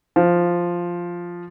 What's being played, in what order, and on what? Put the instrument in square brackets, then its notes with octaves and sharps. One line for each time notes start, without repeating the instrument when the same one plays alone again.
[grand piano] F3